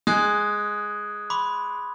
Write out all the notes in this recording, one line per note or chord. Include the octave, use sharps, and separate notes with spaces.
G#3 D#6 F#6 G#6
B5 C6 D6